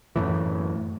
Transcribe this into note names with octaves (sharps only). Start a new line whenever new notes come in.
F#2 A2 E3